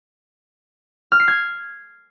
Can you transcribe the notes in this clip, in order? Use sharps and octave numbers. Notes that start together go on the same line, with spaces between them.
F6
C7
G#6